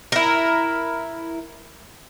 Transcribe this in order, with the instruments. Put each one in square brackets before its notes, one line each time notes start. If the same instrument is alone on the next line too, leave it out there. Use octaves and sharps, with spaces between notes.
[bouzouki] E4 A#4